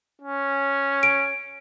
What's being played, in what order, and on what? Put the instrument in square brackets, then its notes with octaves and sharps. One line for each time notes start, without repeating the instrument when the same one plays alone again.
[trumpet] C#4
[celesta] D7